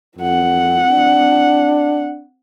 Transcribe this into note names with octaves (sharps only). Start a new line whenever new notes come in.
F2 C4 F#5
D4